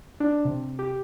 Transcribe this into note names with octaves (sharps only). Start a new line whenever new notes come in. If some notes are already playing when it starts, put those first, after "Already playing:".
D4
C3
G4